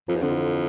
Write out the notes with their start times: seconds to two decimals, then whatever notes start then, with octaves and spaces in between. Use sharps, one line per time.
0.08 F2 F3
0.16 E2
0.22 F2 D3
0.31 E3